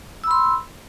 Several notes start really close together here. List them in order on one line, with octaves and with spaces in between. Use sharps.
E6 B5 C6